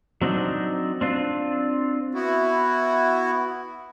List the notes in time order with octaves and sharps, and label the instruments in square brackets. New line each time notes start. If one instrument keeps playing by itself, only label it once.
[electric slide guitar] F#3 C4 D4 D#4
C4 D4 F4
[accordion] B3 E4 F#4